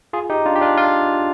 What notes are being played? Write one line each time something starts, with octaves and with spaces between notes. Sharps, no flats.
F4 G#4
D#4 G4
D4 F4
G4
D4 F4
D4 F4